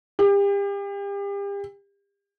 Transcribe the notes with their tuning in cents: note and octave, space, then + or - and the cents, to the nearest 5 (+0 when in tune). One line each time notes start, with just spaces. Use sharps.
G4 +35